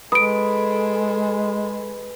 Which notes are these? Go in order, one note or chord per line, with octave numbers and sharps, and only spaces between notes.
G#3 G#4 A4 B4 D#6 D7